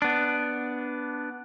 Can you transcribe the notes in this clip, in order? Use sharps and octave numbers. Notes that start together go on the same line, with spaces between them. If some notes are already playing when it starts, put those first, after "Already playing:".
B3 D4